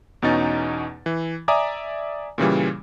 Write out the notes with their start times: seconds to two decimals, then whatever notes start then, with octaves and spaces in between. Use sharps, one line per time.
0.22 E2 B2 C#4 D#4 A6
1.06 E3
1.48 D5 E5 G#5 A#5 D6 D#6
2.38 A#2 C#3 E3 G3